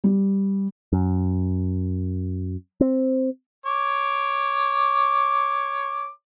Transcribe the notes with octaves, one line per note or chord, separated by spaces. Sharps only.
G3
F#2
C4
C#5 D6